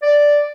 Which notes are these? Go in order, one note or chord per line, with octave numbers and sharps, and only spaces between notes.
D5